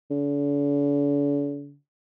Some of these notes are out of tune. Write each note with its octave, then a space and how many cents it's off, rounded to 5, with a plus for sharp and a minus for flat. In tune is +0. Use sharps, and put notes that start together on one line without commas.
D3 -45